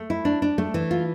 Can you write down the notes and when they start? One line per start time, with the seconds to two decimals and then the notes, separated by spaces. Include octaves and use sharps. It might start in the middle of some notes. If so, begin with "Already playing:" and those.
Already playing: A3
0.10 E4
0.25 D4
0.42 D4
0.58 A3
0.74 E3
0.91 F4